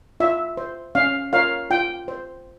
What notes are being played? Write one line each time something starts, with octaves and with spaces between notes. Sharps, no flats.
F4 E5
C5
C#4 F5
F4 A#4 C#5 F5
F4 G5
C5